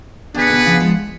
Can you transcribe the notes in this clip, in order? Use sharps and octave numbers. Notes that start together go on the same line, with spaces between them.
B2 D3 D4 G#4 B4 F#5
B2 D3
C#3 F3
F3 G#3